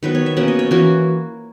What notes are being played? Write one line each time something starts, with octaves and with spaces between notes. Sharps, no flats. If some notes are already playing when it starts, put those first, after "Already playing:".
D#3 F#3 B3 B4
C#5
E5
B2 A#3 C#4 F#5
D#5
C#5
E3 A#3 C#4 F#4